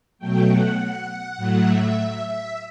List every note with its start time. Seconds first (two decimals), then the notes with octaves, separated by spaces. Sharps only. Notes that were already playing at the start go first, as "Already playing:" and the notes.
0.19 B2 F#3 A3 G5
0.48 F#5
0.77 F#5
1.07 F#5
1.37 A2 F#3 A3
1.66 E5
2.25 E5